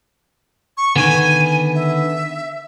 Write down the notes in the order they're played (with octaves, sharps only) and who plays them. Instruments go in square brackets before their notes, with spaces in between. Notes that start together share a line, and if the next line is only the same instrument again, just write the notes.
[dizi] C#6
[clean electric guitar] D3 D#3 B3 [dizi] G#5
[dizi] E5